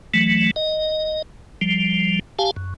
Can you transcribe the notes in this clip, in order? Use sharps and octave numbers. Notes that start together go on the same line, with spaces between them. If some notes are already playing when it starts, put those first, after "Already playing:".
E3 F#3 A3
D#5
F3 G3
G4 F5 G#5 A5
F#2